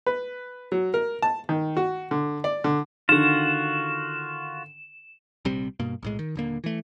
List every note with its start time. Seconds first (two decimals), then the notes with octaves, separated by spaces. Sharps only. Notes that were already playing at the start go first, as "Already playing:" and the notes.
0.06 B4
0.72 F#3
0.94 A#4
1.22 A5
1.49 D#3
1.77 F#4
2.11 D3
2.44 D5
2.64 D3
3.09 D3 D#3 F4 F#4 E7
5.45 A#1 C3 G3 C4
5.80 G2 B2 A#3
6.03 B1 A2 G#3
6.19 D#3
6.35 D#1 D3 A#3
6.64 E3 A3